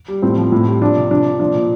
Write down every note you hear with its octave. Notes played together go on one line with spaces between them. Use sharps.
G3
A2 C4
F3
A2
G3
F3 D4
C3
F3 D4
F3
F3 D4
A#2